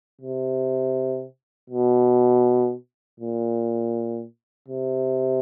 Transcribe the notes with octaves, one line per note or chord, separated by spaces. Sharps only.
C3
B2
A#2
C3